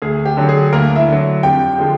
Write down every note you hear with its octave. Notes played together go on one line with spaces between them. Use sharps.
D2 G#4
G4
D3 F#3
G#4
D2 A#3 A#4
E4 E5
D3 F#3
F2 G4 G5
D3 F3 G#3